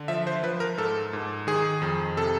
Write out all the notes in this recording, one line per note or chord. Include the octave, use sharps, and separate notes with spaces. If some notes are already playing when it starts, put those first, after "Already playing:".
Already playing: D3
F3 E5
C5
F3 B4
A#4
G#2 A4
G#2
D#3 G#4
F2
C3 A4